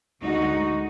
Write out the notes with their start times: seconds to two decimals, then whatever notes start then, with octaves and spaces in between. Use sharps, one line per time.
0.22 D2 D3 G#3 D#4 F#4